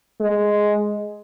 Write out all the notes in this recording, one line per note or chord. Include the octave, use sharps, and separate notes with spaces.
G#3